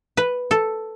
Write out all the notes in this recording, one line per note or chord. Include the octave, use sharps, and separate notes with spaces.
B4
A4